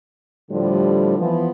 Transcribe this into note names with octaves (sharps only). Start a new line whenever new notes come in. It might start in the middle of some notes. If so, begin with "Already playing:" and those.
A2 D3 F3 G3
E3 F3 B3